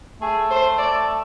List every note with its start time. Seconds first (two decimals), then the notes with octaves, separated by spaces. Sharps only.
0.22 A3 G#4
0.50 C5
0.78 D5